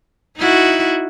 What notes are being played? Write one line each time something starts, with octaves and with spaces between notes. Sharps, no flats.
D#4 E4 F#4